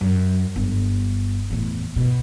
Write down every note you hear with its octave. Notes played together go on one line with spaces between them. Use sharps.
F#2
G1
E2 A2
B2